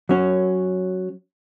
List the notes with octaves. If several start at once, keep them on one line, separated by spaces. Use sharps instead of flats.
F#3 C#4